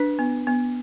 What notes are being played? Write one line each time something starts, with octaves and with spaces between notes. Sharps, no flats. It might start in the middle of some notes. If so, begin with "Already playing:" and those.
Already playing: D4 B4
B3
B3